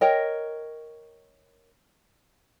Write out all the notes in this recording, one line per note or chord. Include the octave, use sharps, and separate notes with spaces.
A#4 C#5 D#5 G5